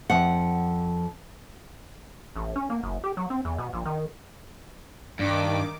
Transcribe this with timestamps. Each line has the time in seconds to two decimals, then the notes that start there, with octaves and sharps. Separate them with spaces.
0.10 F2 F#5
2.36 A1
2.56 C#4
2.70 A#3
2.83 F#1
3.04 G4
3.17 F#3
3.30 C4
3.45 E2
3.58 B2
3.73 A#1
3.86 D#3
5.19 G2 D#3 D6